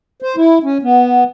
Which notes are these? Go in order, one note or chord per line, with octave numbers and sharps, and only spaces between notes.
C5
E4
C#4
B3